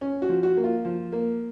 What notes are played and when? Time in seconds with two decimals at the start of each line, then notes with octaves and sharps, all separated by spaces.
0.01 C#4
0.22 F#4
0.29 F3
0.43 F#4
0.57 A#3
0.64 F4
0.85 F3
1.12 A#3